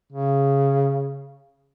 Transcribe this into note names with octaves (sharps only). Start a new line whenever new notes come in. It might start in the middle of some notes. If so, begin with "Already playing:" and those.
C#3